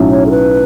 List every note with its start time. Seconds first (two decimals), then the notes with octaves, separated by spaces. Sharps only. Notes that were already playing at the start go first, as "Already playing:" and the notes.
Already playing: B1 A2 F#3 C#4
0.10 C#5
0.26 A4
0.31 B4